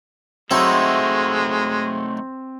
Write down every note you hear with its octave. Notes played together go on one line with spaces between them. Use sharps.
F#3 G#3 A3 C4 D#4 E4 A4